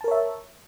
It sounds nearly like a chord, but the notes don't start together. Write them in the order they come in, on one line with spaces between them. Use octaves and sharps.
A5 A#4 C#5 E5